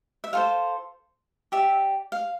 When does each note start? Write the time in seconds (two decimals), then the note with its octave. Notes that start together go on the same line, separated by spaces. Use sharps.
0.24 E5
0.33 F4 A4 C5 F5
1.52 G4 D5 E5
2.12 F5